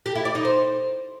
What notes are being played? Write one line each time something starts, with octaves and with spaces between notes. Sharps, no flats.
G4
E4
D5
D#4
C5